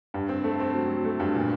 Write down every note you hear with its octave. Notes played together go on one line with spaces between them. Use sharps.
G2
C4
A3
C4
F#3
F#3
A3
G2
A#2